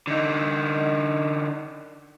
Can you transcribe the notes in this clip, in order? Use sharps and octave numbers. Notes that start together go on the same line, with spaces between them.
D3 D#4